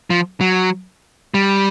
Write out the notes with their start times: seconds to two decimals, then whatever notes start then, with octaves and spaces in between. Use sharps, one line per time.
0.10 F3
0.41 F#3
1.34 G3